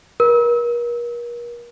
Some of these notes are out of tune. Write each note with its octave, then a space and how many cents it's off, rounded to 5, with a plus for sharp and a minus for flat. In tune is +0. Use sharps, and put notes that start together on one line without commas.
A#4 +40